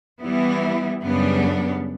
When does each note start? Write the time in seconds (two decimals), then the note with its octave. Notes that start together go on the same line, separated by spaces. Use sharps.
0.21 E3 G3 B3 E4
1.04 F#2 C#3 G3 B3 D4